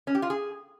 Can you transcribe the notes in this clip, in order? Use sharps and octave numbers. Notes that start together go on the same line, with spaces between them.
C#4
G4
F4
G#4